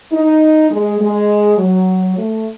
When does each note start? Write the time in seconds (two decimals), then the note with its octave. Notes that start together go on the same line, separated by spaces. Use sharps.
0.12 D#4
0.71 G#3
1.00 G#3
1.58 F#3
2.17 A3